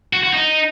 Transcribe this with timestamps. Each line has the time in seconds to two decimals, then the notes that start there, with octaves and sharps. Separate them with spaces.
0.13 F#4
0.24 F#4
0.33 D#4